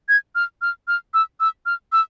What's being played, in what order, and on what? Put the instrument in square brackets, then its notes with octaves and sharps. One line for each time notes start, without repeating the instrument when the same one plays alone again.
[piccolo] G#6
F6
F6
F6
E6
E6
F6
E6